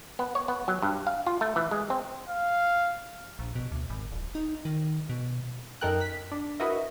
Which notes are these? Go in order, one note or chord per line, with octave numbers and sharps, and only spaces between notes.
B3
C#5
B3
F#3
G2
F5
F4
A3
E3
G#3
C4
F5
A#1
B2
D2
G#1
D1
D#4
D#3
B2
F#2 D#4 A4 A#4 G5 F#6
B6
D4
E4 F#4 A#4 B4 D#5 E5